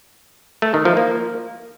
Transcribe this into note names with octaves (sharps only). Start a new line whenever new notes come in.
A3
D#3
F3
A#3